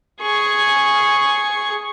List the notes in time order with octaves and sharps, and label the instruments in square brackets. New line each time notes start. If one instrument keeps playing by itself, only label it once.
[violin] G#4 C#6